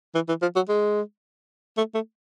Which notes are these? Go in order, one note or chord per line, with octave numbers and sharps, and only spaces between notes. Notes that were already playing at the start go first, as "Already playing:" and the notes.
E3
E3
F3
F#3
G#3
A3
A3